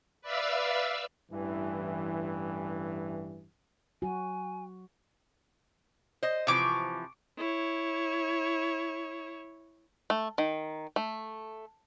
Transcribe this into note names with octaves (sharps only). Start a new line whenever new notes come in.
B4 D5 E5 F5 E6
A1 G2 E3
F#3 F#4 G#5
C5 D#5
C3 E3 F3 C#6 D6
E4 C#5
A3
D#3
A3